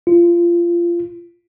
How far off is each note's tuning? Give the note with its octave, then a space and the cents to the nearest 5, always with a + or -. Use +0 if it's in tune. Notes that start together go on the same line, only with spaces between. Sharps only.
F4 -25